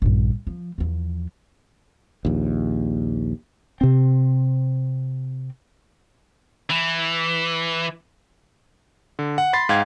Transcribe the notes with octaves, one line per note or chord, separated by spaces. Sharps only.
A#1 G2
F3
E2 F3
A#1 D#2
C3 C4
E3
D3
F#5
B5 C6 A6 C7
G#2 F5 G5 G#6